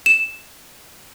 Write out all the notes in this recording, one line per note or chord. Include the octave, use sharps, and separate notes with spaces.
E7